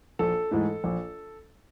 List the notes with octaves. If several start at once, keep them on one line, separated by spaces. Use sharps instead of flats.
A#1 A4
G#2 E3 A3
A#1